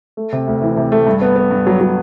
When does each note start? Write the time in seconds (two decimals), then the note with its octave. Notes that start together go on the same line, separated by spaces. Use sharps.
0.17 A3
0.33 C3
0.47 D2
0.62 E3
0.77 C3
0.92 A3
1.07 G2
1.21 B3
1.36 B3
1.51 G2
1.67 F#3
1.80 F#3